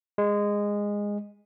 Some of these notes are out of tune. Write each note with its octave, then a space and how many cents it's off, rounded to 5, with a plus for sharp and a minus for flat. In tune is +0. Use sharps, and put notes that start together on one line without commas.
G#3 -15